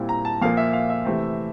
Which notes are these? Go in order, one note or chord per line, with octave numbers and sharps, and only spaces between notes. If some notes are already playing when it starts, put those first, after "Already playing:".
Already playing: A#2 G3 C4 E4
A#5
A5
A#2 F3 A#3 F5
E5
F5
E5
C3 E3 A3 C4